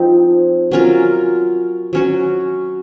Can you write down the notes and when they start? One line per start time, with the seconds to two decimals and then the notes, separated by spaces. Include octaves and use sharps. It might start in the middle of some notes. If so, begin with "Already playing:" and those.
Already playing: F3 C4 D#4
0.71 F#3 C#4 F4 A#4
1.93 F#3 C#4 F#4